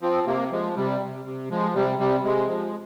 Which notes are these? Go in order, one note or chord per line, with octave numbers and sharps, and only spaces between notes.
F3 C4
C3 A#3
F3 G#3
C3 G3
C3
C3
F3 G#3
C3 G3
C3 G3
C3 G#3
F3